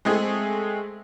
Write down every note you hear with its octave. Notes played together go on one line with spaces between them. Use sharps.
G#3 A3 C4 G#4